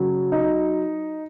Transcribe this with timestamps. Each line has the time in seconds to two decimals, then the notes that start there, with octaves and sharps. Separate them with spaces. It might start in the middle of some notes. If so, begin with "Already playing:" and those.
Already playing: C#3 F#3
0.32 D#4